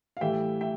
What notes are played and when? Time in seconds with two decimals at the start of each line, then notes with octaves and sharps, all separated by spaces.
0.17 F5
0.21 A2 E3 G3 E5 G5
0.61 E5 G5